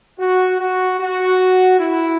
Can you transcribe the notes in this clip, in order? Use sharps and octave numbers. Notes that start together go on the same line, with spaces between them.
F#4
F#4
F#4
E4